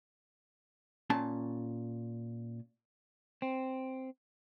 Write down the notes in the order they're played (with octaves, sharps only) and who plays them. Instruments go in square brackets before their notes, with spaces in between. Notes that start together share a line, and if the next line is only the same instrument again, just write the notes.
[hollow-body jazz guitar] A#2 C#4 A5
[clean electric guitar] C4